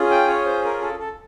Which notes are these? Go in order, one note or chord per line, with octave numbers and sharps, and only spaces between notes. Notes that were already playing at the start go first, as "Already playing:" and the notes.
Already playing: C#4 F4 G#4
G5
C#5
C5
A#4
A4
A4